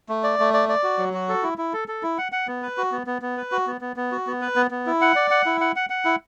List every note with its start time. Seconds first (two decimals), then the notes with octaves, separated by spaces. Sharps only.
0.09 A3
0.23 D5
0.39 A3
0.54 D5
0.69 D5
0.83 F#4
0.98 F#3
1.13 F#4
1.29 A4
1.43 E4
1.58 E4
1.73 A4
1.88 A4
2.03 E4
2.18 F#5
2.32 F#5
2.47 B3
2.62 B4
2.78 F#4
2.92 B3
3.07 B3
3.22 B3
3.37 B4
3.52 F#4
3.67 B3
3.81 B3
3.96 B3
4.12 F#4
4.27 B3
4.41 B4
4.56 B3
4.71 B3
4.86 E4
5.01 F#5
5.16 D5
5.31 F#5
5.46 E4
5.61 F#5
5.76 F#5
5.90 F#5
6.05 E4